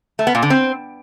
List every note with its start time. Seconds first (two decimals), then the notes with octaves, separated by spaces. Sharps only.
0.19 A3
0.27 B3
0.35 A#2
0.42 D3
0.50 C4